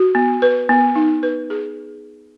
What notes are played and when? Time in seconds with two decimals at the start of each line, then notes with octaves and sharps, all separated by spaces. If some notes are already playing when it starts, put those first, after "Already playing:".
Already playing: F#4
0.15 B3
0.42 B4
0.69 B3
0.96 D#4
1.23 B4
1.50 G#4